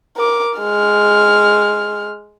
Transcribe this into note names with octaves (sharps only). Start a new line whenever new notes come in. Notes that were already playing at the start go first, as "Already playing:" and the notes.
A#4 D6
G#3 F6